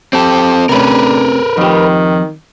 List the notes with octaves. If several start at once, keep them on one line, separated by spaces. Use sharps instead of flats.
C4 G4 A4
C3 A3 C#4 D4 A#4 B4
F2 D#3 G4